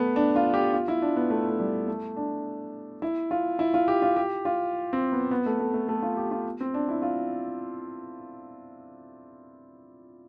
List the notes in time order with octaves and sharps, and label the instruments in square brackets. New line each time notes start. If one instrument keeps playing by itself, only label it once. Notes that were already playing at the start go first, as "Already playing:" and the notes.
Already playing: [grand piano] A3 B3
D4
F4
G4
F4
E4
D4
B3
A3
A3
G3
A3
D4
E4
F4
E4
F4
G4
F4
G4
F4
C4
B3
B3
A3
A3
A3
A3
F4
G4
F4
C4
D4
E4
F4